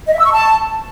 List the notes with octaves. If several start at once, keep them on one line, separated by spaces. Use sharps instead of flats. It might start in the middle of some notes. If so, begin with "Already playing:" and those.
D#5
E5
E6
C#6
A5